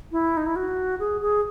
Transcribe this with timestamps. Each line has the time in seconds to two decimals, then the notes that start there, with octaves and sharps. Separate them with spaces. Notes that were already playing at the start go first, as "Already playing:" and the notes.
0.12 E4
0.37 D#4
0.46 E4
0.56 F#4
1.00 G#4
1.21 G#4